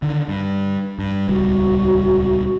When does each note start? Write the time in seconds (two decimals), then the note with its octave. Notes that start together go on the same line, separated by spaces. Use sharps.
0.02 D3 D#3
0.28 G2
0.99 G2
1.29 D#1 C#2 G3 F#4